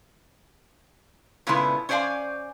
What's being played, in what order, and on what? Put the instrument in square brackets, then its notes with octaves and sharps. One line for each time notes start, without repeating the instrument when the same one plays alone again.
[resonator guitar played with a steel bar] A#2 C#3 G#3 A3 B3 E4
C#4 C5 D5 E5 F5 G#5